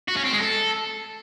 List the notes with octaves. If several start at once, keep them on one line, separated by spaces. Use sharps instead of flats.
F#4
C#4
C4
G#3
A4